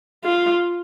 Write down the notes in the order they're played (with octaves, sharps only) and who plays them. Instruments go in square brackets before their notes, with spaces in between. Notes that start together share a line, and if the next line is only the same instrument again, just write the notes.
[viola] F4